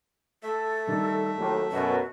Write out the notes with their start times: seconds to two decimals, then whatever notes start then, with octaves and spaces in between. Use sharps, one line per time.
0.43 A3 A4 E5
0.87 D#3 G3
1.38 D#2 A2 F#3
1.71 F#2 B2 F#4